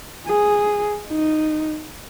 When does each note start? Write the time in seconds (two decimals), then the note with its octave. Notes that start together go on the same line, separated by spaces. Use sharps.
0.27 G#4
1.08 D#4